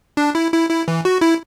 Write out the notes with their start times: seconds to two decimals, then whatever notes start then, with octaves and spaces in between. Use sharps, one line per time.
0.17 D4
0.35 E4
0.53 E4
0.69 E4
0.88 E3
1.05 F#4
1.21 E4